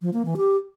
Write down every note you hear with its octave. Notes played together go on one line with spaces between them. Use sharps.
F3
A#3
E3
G4